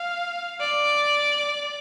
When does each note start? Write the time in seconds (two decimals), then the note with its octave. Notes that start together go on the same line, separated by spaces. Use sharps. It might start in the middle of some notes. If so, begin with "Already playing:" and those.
Already playing: F5
0.60 D5